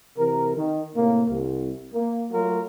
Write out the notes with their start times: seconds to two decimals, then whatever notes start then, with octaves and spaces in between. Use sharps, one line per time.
0.17 C3 E3 A#4
0.56 D#3
0.95 A2 C3 A#3
1.29 C2
1.92 A#3
2.31 F#3 A3 F4 F#4 A#4